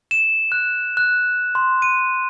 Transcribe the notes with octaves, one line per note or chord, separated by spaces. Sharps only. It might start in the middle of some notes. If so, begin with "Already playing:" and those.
E7
F#6
F#6
C6
D#7